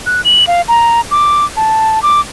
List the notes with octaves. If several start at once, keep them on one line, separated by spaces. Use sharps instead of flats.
F#6
F#7
F5
A#5
D6
A5
D6